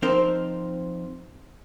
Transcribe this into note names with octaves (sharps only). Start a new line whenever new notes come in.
F3 C4 D#4 A#4 C5